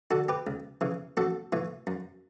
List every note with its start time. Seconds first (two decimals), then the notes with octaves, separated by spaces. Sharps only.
0.11 D3 F#4 A4
0.29 G4 B4
0.47 C#2
0.81 C#3 E3
1.17 A1 F#4 A4
1.53 A2 E3
1.87 F#2